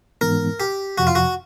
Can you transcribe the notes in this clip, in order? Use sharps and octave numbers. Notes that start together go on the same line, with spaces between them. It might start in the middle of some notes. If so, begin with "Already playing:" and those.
G#2 E3 G#3 B3 D#4 A#4
G4
F2 C3 F3 F#4
F4
F#4